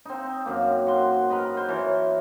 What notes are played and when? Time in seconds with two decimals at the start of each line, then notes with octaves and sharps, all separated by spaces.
0.05 C4 D#4
0.46 F#2 A#3
0.87 F#4 C6
1.29 A#4 B4 D#5 A#5
1.57 C5
1.69 E3 A#4 C#5